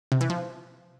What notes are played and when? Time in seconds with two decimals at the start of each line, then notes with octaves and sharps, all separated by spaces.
0.12 C3
0.21 E3
0.30 F3